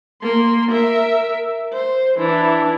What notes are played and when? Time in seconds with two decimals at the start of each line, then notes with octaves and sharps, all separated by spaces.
0.22 A#3 C6
0.71 A#4 E5
1.73 C5
2.19 E3 D4